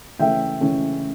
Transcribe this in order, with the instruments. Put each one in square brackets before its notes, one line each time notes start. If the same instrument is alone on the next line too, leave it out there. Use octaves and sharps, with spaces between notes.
[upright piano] C#3 E3 A3 C#4 E5 G5
C#3 E3 A3 C#4